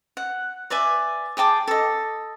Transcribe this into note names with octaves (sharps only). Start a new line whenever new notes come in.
F#5
B4 D5 E5 G#5
G#4 G5 A5 D6
A4 D#5